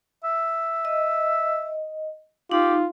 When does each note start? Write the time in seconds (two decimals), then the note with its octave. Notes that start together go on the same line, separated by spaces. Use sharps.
0.24 E5
0.85 D#5
2.51 D#4 F4 G4